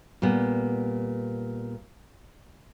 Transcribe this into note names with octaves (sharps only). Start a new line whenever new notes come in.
A#2 G3 B3